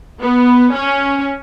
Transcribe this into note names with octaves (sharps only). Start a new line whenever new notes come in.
B3
C#4